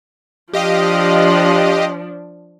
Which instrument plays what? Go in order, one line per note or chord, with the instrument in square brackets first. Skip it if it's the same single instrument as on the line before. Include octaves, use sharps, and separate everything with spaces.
[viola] F3 D4 [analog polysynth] G4 D#5 F5